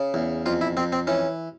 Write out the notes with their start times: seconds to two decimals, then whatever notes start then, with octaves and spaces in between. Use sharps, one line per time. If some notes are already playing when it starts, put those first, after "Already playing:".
Already playing: C#3
0.14 E2
0.46 F2 F4
0.61 E4
0.77 F2 C4
0.92 C4
1.07 E3 C#4